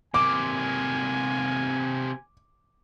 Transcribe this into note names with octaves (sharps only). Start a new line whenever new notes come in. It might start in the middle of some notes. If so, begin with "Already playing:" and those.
C3 A#3 G#5 D6